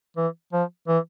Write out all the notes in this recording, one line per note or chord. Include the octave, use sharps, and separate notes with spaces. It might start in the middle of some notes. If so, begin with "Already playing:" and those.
E3
F3
E3